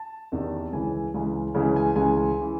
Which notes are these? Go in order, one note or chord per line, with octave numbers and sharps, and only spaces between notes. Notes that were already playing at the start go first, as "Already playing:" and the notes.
Already playing: A5
E2 C3 D#3
C#2 C#3 E3 G#5
C#2 C#3 E3
C#2 C#3 E3 G#5
G#5
C#2 C#3 E3 G#5
E3